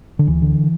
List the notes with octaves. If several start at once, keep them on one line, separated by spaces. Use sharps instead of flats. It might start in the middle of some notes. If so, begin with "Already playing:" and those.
D3
D2 E3
D3